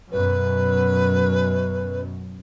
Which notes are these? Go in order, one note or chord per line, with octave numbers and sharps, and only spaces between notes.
F#2 B2 B4